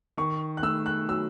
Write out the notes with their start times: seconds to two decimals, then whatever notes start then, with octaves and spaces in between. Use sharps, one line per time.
0.17 D#3 C#6
0.57 F#6
0.62 A3 E6
0.86 F#6
1.09 F#3 E6